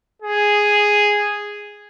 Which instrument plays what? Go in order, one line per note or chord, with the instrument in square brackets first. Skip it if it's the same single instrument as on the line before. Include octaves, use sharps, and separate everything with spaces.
[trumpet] G#4